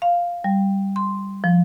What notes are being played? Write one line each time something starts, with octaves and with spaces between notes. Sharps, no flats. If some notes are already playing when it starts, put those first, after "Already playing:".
F5
G3
C6
F3